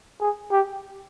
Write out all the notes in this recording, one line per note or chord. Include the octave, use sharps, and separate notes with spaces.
G#4
G4